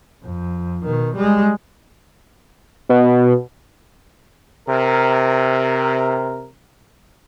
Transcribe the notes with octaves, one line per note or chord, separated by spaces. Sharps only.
F2
B2 D#3
G3 G#3
B2
C3 A#4